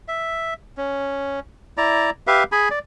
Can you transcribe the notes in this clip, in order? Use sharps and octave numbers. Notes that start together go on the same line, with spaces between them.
E5
C#4
E4 D5 A#5
G4 B4 E5 F5
G#4 G#5 B5
D5